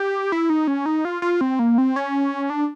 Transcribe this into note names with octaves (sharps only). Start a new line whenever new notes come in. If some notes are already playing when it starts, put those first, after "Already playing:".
Already playing: G4
E4
D#4
C#4
D#4
F4
F4
C4
A#3
C4
C#4
D4